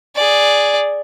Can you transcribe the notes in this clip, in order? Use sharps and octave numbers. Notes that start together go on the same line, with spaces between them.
G#4 D5